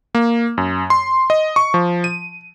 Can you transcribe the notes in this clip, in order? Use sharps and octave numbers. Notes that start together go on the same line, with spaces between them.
A#3
F#2
C6
D#5
C#6
F3
D#7